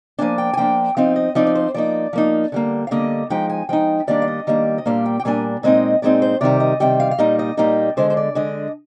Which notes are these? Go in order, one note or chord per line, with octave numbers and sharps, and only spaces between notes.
F3 A#3 D4 G#5
G5
G#5
F3 A#3 D4 G5
F3 C4 D#4 F5
D#5
F3 C4 D#4 D5
D5
C5
F3 A#3 D#4 D5
F3 A#3 D#4
D3 G3 A#3
F5
D3 G3 A#3 D#5
F3 G#3 D#4 G5
G#5
F3 G#3 D#4 G5
D#3 G3 A#3 D4 D5
F5
D#5
D#3 G3 A#3 D4
D#5
A#2 G3 A#3 D4 F5
G5
G5
A#2 G3 A#3 D4 G#5
A#2 G#3 C4 D#4 D#5
A#2 G#3 C4 D#4 D5
C5
C3 D#3 G3 D5
D#5
C3 D#3 G3 G5
F5
F5
A#2 G3 A#3 D#4 D#5
D#5
A#2 G3 A#3 D#4 D#5
D3 G#3 D4 C5
C5
D5
D3 G#3 D4 D#5